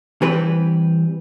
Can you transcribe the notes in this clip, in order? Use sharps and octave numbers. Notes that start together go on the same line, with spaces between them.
E3 G3 C4 G4 B4